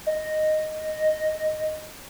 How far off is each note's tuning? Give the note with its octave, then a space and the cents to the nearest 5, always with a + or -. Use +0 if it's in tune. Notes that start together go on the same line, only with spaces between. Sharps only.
D#5 -10